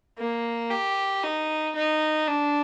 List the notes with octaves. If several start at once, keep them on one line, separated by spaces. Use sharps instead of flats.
A#3
G4
D#4
D#4
D4